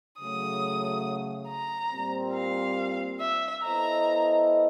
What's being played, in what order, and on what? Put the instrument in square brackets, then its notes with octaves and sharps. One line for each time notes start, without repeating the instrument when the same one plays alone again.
[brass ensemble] C#3 F#3 A3 [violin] D#6
[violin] A#5
[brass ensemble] A#2 G3 C4
[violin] F5
E5
[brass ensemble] B3 E4 A4 C5 D#5 [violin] A#5